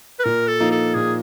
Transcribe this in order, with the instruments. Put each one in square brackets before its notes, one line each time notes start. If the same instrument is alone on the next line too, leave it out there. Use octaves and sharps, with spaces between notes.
[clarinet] B4
[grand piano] A#2 [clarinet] A#4
[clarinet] A4
[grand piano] F3 A#3 D#4
[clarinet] A4
[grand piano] A#2 [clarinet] G#4